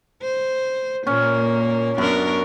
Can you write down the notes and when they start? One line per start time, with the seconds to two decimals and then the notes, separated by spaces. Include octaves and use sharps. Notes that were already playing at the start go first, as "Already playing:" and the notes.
0.22 C5
1.07 A#2 A#3 C#4
1.98 F#2 B3 D4 A#4